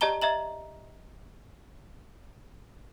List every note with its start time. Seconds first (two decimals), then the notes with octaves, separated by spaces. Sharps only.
0.01 G4 D5 D#5 A5 A#5 G7
0.22 D#5 E5 A#5 F#7